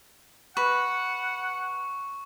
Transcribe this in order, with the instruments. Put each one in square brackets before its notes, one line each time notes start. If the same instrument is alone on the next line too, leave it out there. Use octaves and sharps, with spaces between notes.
[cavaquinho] B4 [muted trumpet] F#5 [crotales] C#6